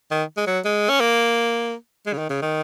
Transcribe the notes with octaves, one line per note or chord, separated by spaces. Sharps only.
D#3
G#3
F#3
G#3
C#4
A#3
G#3
C#3
D#3
C#3
D#3